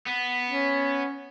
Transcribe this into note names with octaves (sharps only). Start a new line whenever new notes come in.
B3
C#4